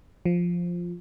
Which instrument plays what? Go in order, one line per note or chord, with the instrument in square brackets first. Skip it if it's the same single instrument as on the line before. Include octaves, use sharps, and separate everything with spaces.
[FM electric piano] F3